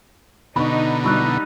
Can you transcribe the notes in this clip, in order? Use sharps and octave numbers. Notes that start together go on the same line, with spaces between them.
B2 D3 D#4 B5 C#6
C2 F#3 G3 D#4 B5 C#6 E6 F#6